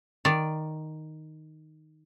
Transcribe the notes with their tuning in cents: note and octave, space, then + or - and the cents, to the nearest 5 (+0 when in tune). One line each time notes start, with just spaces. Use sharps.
D#3 +0 D5 +0